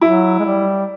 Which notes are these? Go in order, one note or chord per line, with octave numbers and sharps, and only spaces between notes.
F#3 E4
G#3
G3